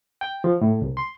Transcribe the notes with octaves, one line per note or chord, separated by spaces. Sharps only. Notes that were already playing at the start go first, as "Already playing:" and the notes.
G5
F3
A2
C2
C6